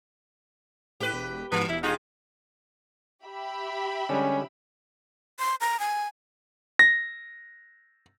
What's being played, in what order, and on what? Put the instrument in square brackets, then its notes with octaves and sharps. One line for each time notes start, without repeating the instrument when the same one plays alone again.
[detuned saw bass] A2 [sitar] G4 B4
[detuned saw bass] E1
[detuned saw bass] G#2 [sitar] E3 [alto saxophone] B3
[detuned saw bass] E1 [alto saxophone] E4
[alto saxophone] D#4 [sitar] F4 G4 G#4
[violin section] G4 E5 B5
[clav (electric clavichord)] D3 G3 G#3 [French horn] C#4
[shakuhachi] C6
A#5
G#5
[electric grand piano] A#6